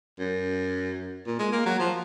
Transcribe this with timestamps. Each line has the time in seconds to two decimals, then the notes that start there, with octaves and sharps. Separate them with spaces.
0.20 F#2
1.26 A#2
1.39 G#3
1.52 A#3
1.66 F#3
1.79 F3